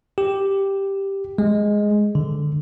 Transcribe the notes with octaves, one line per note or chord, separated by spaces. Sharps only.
G4
G#3
D3